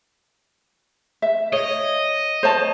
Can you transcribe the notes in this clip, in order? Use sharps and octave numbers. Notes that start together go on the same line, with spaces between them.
E5
C#5 D#5
C5 C#5 A5